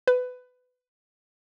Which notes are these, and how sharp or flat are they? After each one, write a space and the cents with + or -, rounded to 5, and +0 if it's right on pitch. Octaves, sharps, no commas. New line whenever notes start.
B4 +20